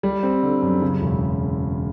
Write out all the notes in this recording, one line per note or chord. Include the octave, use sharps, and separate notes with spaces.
G3
C4
D3
F#2
C#3
E1